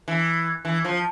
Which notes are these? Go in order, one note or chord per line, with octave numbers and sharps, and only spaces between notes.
E3
E3
F3